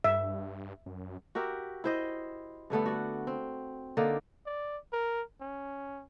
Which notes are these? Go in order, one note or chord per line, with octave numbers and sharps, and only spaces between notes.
G2 E5
F#2
F#4 G4 A#4 E5
E4 C5 D#5
G2 D3 A3 B3
F#4 D5
C4
D3 A#3 D#4 D5
D5
A#4
C#4